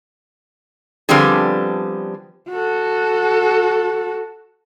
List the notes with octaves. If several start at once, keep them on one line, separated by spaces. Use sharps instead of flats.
D3 F3 G3 B3 C4 G#4
F#4 A4